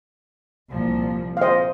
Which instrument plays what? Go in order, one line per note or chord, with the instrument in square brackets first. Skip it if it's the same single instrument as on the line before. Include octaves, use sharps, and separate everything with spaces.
[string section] C2 A#2 F3
[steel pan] F5
C5 D#5